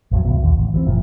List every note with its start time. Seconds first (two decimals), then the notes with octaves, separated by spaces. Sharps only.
0.11 A1 F2 F#3
0.25 D1 G1 C#2 B2
0.42 A#1 D#2
0.58 A1
0.74 E3 F3 C4
0.87 F#1 A#2 F3